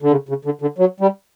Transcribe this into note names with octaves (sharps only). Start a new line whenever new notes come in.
D3
C#3
C#3
D3
D3
F#3
G3